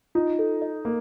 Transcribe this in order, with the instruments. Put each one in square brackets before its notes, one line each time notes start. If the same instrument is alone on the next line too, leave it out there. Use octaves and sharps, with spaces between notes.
[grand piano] D#4 [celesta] F4
[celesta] A4
D#5
[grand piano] A#3